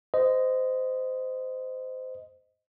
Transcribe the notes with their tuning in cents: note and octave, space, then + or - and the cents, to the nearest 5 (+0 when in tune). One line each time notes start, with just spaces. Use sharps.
C5 -20 D#5 +0